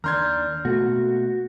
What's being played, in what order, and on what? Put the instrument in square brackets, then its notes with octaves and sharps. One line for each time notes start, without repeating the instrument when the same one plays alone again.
[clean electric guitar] D#2 D4 [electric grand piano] A#5 C6 G#6 [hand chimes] F6 G6
[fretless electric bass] B2 A3 A#3 [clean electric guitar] F#4